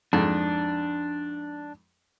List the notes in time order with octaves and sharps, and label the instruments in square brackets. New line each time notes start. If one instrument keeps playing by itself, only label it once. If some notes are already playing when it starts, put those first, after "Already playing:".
[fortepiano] F2 G#2 [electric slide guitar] D4